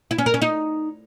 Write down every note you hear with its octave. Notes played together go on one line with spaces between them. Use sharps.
E4
C#4
A#4
C#4
D#4